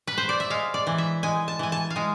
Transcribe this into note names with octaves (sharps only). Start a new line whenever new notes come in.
B4
C5
D5
E5
G#3 F5
D5
E3
E5
G#3 G#5
A5
E3 G#5
A5
F5
G#3 G#5